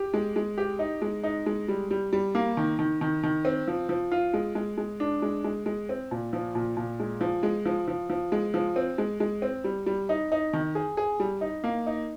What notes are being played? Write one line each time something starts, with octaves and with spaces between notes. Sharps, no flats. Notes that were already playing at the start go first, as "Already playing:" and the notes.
Already playing: G4
G#3
G#3
G4
D#4
G#3
D#4
G#3
G3
G3
G3
A#3
D#3
D#3
D#3
D#3
C4
F3
F3
F4
G#3
G#3
G#3
D4
G#3
G#3
G#3
C4
A#2
F3
A#2
A#2
G#3
F3
G#3
F3
F3
F3
G#3
F3
C4
G#3
G#3
C4
G3
G3
D#4
D#4
D#3
G#4
G#4
G3
D#4
A#3
D#4